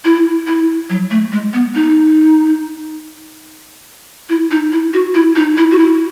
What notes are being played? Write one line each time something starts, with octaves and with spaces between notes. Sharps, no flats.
E4
E4
F#3
A3
G#3
B3
D#4
E4
D#4
E4
F#4
E4
D#4
E4
F#4
E4